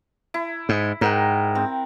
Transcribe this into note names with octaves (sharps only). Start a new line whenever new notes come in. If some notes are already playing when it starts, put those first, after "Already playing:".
E4
G#2
G#2 A#4 F#5 G5
C4